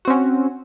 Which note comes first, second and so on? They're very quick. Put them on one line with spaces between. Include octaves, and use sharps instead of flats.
F#4 C4 C#4